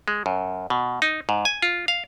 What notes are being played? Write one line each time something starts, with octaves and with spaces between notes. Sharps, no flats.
G#3
F#2
B2
D#4
G#2
G#5
F4
F5